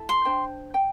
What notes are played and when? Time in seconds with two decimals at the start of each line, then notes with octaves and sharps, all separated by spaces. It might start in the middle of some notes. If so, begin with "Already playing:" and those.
Already playing: E4 A4
0.09 C6
0.25 D4 C5 G5
0.74 G5